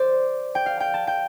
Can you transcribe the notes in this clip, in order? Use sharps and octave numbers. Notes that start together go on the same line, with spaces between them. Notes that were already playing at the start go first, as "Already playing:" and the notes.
Already playing: C5 D5
G5
F5
G5
A5
G5